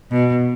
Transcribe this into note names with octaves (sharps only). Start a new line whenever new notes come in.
B2